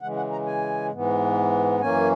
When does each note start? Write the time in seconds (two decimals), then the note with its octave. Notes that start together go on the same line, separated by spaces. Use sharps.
0.01 C#3 E3 G#3 F#5
0.16 F#5
0.31 A#5
0.46 G#5
0.92 G#2 E3 B3
1.80 F#2 E3 A#3 C#4 G#5